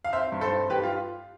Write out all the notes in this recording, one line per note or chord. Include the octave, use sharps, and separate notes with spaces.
F5
C4 C5 E5
G2
A4 C5
C4
G2 G4 B4
F4